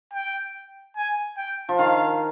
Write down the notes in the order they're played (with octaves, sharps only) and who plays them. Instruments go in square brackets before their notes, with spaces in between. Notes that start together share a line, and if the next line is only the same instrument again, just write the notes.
[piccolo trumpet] G5
G#5
G5
[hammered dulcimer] F3
[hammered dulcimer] D#3 [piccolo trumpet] F5